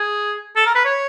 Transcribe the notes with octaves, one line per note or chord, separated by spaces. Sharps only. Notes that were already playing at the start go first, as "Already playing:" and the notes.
Already playing: G#4
A4
A#4
B4
C#5